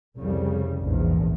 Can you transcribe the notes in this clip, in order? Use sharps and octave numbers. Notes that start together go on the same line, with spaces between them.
C2 F2 C#3 G3
A#1 E2 G#2